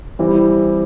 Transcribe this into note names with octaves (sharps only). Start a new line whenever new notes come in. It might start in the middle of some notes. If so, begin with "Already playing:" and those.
E3 G3 C4